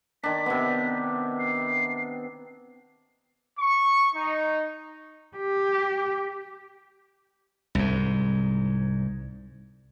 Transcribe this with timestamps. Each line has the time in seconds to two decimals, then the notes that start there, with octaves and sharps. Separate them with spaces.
0.24 D#3 D4 B6
0.46 C3 B3
1.39 C7
3.59 C#6
4.14 D#4
5.37 G4
7.75 C2 G#2